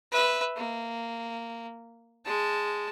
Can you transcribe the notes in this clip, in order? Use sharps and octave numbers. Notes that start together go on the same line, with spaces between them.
B4 E5
A#3
G#3 A5